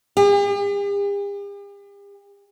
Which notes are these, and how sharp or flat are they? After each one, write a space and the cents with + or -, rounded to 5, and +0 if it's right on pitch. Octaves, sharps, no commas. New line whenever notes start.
G4 +45